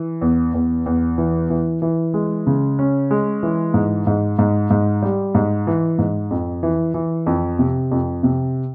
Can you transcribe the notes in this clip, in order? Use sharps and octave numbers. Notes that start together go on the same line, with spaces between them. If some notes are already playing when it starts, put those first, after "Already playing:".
Already playing: E3
E2
E2
E2
E3
E3
E3
G#3
C#3
C#4
G#3
E3
G#2
G#2
G#2
G#2
G3
G#2
E3
G#2
F2
E3
E3
F2
C3
F2
C3